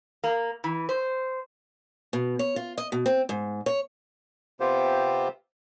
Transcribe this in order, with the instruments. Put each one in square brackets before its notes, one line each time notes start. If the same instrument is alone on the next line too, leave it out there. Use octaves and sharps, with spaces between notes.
[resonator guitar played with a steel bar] A#3
E3
C5
[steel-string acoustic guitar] B2
C#5
F4
D#5
B2
C4
G#2
C#5
[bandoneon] C3 B3 C4 F4 G4 C5